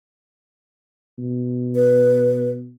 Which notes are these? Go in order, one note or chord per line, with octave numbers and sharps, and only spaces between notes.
B2
B4